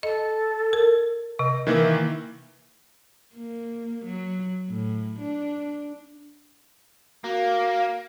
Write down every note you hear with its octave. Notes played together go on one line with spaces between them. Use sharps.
A4 D#5
A#4
C3 D#5
D#3 E3 A#3 E5
A#3
F#3
A2
D4
A#3 F#4 F5